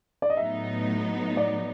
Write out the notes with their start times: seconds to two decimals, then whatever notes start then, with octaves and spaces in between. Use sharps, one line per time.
0.22 D5
0.30 D#5
0.37 A2 F#3 B3 D#4 E5
1.37 D5